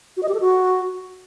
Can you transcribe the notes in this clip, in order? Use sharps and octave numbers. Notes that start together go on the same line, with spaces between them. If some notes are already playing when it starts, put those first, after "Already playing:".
F#4
D#5
G4
A4
F#4